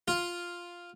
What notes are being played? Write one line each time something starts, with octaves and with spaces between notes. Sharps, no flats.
F4